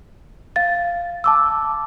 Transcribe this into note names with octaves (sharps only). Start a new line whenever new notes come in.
F5 A6
A5 D6 E6